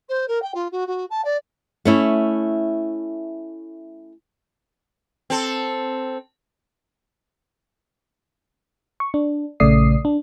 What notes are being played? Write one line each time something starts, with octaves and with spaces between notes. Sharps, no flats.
C5
A#4
G5
F4
F#4
F#4
A5
D5
A3 C#4 E4
C4 A4
C#6
D4
A#1 C#3 A3 D5 D#6 C7
D4